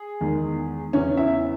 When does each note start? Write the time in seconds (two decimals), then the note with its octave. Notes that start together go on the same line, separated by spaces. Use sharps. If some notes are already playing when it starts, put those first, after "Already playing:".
Already playing: G#4
0.21 E2 D#3 G#3
0.93 E2 C#3 E3 C#4 C#5
1.17 E4 E5